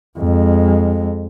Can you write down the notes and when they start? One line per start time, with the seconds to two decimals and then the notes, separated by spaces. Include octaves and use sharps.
0.18 F2 G#3